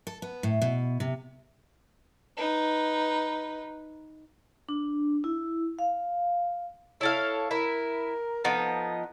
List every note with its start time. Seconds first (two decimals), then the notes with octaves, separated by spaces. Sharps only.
0.07 A4
0.22 B3
0.43 A2
0.62 B2
1.00 C3
2.37 D#4 B4
4.69 D4
5.24 E4
5.79 F5
7.01 E4 A4 C#5 F5
7.51 E4 A#4
8.44 F3 B3 D#4 A4